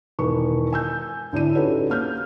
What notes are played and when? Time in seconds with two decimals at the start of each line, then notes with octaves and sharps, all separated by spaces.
0.19 E1 D#3 B4 C#6
0.73 G#5 E6 G6
1.33 D2 A2 D4 D#7
1.55 C#4 D#4 F#4 G4 A4 B4
1.89 A#3 F6 G6